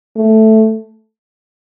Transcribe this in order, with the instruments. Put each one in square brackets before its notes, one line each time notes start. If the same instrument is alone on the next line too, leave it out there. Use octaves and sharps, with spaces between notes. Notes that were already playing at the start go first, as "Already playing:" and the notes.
[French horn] A3